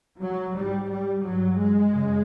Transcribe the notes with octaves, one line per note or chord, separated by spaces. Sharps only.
F#3
G#2 G3
G3
G2 F#3
G#3
F#2 C#3